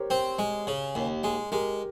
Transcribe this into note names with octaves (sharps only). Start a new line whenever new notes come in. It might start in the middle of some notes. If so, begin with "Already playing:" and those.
Already playing: G4 A#4 C5 C#5
C4
G#3
C#3
D#2
G#3
G#3 G4 A#4